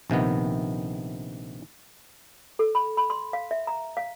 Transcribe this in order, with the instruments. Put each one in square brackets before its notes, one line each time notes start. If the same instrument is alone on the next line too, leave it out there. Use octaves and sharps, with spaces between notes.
[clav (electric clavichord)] A#1 C3 D#3 B3
[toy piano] A4
B5
B5
C6
F5
E5
A#5
F5